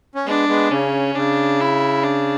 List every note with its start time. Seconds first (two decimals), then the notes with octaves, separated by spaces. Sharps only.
0.15 C#4
0.26 G#3 B3 D4
0.49 G#3 B3
0.71 C#3 C#4
1.15 C#3 D4
1.60 E4
2.04 D4